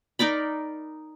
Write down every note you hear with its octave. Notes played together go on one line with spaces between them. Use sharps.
D#4 A#4 D5 B5